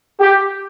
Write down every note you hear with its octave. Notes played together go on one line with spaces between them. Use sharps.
G4